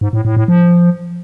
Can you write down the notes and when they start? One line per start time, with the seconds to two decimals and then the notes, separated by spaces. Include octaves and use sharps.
0.01 G#2
0.13 A2
0.25 A2
0.36 A2
0.48 F3